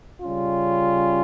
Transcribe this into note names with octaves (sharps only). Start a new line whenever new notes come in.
C#3 G3 C#4 F4